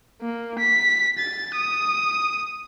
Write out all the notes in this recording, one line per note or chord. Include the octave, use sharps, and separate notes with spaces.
A#3
B6
A6
D#6